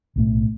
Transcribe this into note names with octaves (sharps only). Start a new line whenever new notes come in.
B1 A2 A3